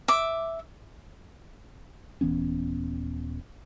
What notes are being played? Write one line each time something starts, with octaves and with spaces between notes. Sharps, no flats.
E5 D6
D#1 E3 B3 C#4